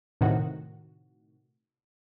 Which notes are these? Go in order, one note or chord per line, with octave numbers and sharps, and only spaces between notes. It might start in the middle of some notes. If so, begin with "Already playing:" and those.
A2 C3 D#3 F#4